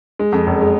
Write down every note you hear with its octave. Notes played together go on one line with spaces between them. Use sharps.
G#3
F2
F#1
G#3